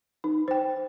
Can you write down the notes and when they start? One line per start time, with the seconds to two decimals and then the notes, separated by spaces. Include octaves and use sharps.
0.24 D#4
0.48 C5 G5